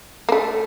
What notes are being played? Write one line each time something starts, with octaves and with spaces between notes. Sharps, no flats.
A#3
A3